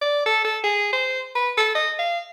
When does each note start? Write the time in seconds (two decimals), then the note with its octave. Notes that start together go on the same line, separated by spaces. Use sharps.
0.01 D5
0.26 A4
0.45 A4
0.64 G#4
0.93 C5
1.35 B4
1.57 A4
1.75 D#5
1.99 F5